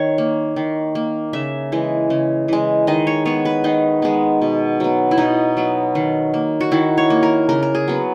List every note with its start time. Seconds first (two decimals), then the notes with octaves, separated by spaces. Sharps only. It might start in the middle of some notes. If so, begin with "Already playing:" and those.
Already playing: D#3 C#5
0.18 A#3
0.56 D#3
0.95 A#3
1.33 C#3 E5
1.72 E3 G#3
2.10 C#3
2.48 E3 G#3
2.87 D#3 D#5
3.07 C#5
3.25 G#3 B3 C#5
3.45 B4
3.64 D#3 D#4
4.02 G#3 B3
4.42 B2
4.80 F#3 B3
5.11 E4
5.18 B2 D#4
5.57 F#3 B3
5.95 D#3
6.34 A#3
6.61 F#4
6.72 D#3 E4
6.98 C#5
7.10 A#3
7.23 A#4
7.49 C#3 A#4
7.63 A#4
7.75 G#4
7.88 F#3 B3